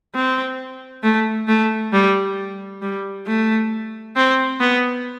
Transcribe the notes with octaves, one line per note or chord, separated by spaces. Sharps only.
C4
A3
A3
G3
G3
A3
C4
B3